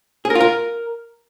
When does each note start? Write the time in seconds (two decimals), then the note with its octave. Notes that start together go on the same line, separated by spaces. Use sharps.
0.25 G#4
0.30 A#4
0.35 F4
0.40 A#4